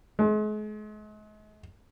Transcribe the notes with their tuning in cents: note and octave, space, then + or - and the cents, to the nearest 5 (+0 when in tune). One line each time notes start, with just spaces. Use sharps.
G#3 +40